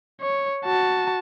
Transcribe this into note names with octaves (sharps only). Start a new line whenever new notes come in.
C#5
F#4 A5